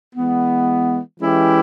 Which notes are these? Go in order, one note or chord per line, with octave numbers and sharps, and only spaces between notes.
E3 G#3 B3
E3 G#3 C#4 E4 G4